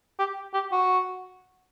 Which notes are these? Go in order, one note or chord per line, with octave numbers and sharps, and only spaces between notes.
G4
G4
F#4